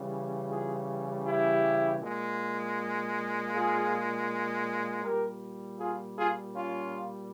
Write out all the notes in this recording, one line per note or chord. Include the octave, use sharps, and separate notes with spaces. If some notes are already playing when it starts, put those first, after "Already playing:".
Already playing: C#3 E3 G3
F4 G#4
E4 G4
A#2 G#3
F4 G#4
A#2 G3 G4 A#4
F4 G#4
F4 G#4
C#4 F4